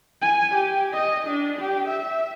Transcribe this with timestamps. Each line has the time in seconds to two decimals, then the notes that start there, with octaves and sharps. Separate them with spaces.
0.22 G#5
0.55 G4
0.94 D#5
1.27 D4
1.59 G4
1.89 E5